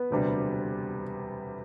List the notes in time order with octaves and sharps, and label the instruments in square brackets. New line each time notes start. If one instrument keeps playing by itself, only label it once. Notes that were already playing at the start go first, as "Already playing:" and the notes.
Already playing: [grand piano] B3
[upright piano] E1 D2 C3 G3 D4